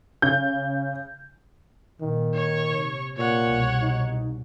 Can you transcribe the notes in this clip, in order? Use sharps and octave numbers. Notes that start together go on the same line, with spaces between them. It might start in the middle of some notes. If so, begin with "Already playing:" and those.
C#3 G6
A#2 D#3
C#5 C#6
C3
A#2 C#5 F#5
C2 B2
D#4